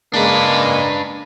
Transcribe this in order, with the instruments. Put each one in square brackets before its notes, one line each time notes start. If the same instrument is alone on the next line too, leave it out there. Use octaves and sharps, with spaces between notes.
[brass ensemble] C#3 G#3 [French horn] A#3 [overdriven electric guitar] D4 B4